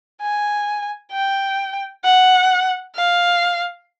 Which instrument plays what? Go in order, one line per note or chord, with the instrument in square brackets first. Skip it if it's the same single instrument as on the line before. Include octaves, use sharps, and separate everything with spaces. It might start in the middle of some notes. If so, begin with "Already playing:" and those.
[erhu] G#5
G5
F#5
F5